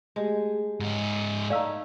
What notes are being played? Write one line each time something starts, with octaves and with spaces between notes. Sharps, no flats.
G#3 A3 G4 G#4
G#2 C#4 D#5
A3 D#4 D5 F5 E6